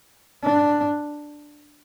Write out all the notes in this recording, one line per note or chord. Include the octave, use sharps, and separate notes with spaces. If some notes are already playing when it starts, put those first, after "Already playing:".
D4